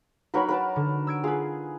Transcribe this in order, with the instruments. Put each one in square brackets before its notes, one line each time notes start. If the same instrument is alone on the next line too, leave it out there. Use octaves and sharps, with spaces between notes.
[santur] F#3 A#4 B4 [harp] D#4 C#5 B5
[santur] A#4 B4 A5
[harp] D3
E6 G#6 D7
[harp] F4 B4 [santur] G#4